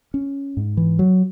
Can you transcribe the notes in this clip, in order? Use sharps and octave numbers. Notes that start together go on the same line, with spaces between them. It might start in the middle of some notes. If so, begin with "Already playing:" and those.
C#4
G#2
E3
F#3